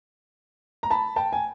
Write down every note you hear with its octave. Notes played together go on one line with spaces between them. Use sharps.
A#5
A5 B5
G5 A5
G#5